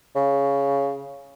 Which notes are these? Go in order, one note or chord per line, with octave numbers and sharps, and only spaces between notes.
C#3